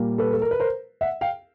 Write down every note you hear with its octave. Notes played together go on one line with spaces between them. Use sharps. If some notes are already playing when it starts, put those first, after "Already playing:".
Already playing: A#2 G3 A#3
A4 B4
A4
A#4
B4
A#4 C5
E5 F#5
F5 G5